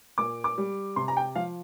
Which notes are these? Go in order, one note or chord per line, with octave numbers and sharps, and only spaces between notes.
A#2 D6
D6
G3
C3 C6
A#5
G5
F3 F5